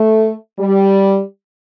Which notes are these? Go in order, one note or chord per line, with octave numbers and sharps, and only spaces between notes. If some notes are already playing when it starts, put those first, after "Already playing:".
Already playing: A3
G3